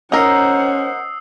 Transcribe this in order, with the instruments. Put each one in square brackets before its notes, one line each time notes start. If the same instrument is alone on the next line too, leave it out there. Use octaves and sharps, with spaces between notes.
[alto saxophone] C#4 [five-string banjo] D#4 A#4 [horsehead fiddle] C5 F#5 [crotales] D#6 E6 C7